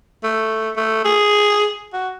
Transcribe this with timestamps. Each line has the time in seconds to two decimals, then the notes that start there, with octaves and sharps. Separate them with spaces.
0.24 A3
0.76 A3
1.05 G#4
1.93 F#4